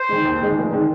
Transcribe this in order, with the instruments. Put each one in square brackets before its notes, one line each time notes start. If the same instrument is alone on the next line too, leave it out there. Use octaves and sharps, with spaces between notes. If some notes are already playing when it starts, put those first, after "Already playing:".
Already playing: [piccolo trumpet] C5
[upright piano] D#3 G#3
D#2
D#3 G#3
F1
D#3 G#3